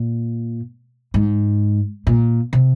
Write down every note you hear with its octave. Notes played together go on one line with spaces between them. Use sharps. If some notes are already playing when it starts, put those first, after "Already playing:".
Already playing: A#2
G#2
A#2
C3